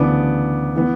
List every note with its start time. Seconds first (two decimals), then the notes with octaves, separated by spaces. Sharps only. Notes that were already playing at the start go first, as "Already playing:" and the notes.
Already playing: D2 C#3 E3 B3 D4 D6
0.76 E3 B3